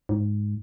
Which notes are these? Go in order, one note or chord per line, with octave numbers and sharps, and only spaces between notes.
G#2